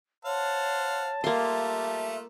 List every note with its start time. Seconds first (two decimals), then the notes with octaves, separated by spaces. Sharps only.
0.25 C5 C#5 F5 F#5 A5
1.24 G3 A3 A#3 F4 E5 C6